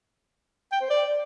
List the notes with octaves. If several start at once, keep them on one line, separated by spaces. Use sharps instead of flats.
G5
C5
D5